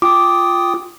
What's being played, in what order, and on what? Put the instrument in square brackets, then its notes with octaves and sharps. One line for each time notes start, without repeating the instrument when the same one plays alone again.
[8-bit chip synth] F4 G5 D#6 [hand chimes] D6